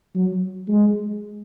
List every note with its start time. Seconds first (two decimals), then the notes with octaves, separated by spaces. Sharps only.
0.15 F#3
0.68 G#3